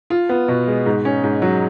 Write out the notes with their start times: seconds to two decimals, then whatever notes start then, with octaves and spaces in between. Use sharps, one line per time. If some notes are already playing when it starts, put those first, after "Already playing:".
0.10 F4
0.29 B3
0.48 B2
0.67 G#3
0.86 G#2
1.05 C#4
1.24 G#2
1.42 F#3